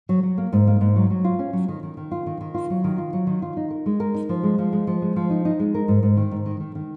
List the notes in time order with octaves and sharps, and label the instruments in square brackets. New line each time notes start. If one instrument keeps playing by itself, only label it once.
[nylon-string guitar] F#3
F#3
A#3
G#2
A#3
G#2
F#3
F#3
F4
C#4
F#3
D#3
D#3
D#3
F4
D#3
D#3
F4
F#3
D#3
F4
F#3
D#3
F4
D#4
A#4
G#3
A#4
D#4
F3
G#3
F3
G#3
F3
G#3
F3
D#4
D#4
G#3
A#4
G#2
G#2
D#3
G#2
D#3
D#3
D#3